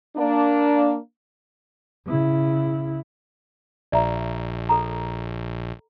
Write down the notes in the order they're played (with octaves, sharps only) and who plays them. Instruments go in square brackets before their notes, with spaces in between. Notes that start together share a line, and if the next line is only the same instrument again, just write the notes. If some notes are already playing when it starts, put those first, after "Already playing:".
[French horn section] A#3 D4
[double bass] C#3 E4
[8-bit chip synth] A#1 [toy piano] D5 E5 A#5
[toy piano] A4 A#5